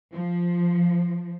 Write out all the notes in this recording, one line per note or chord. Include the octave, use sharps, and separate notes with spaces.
F3